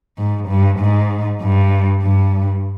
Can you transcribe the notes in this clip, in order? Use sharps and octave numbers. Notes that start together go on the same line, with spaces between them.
G#2
G2
G#2
G2
G2